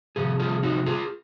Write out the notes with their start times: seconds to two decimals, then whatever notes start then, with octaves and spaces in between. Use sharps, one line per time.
0.16 F2 C3 G#4
0.39 F4 G#4
0.63 D#4 F#4
0.86 F4 G#4